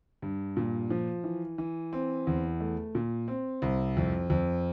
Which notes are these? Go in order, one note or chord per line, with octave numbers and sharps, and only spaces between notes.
G2
A#2
F3
E3
E3
C4
E2
A3
A#2
C4
C2
F2
F2